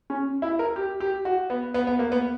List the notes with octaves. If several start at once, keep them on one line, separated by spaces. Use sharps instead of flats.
C#4
E4
A#4
G4
G4
F#4
B3
B3
B3
A#3
B3